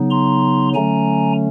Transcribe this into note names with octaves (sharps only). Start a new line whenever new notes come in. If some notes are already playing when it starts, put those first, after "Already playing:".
Already playing: C#3 F#3 B3 D#4
A#5 C6
D3 F#3 A3 C#4 G#5 A#5